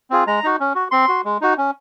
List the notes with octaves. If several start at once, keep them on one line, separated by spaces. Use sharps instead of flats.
C4 F4 G#4
G#3 A#5
D#4 F#4
C#4
F#4
C4 C6
F#4
G#3
D#4 F#4
C#4